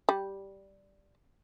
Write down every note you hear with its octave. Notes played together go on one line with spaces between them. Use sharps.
G3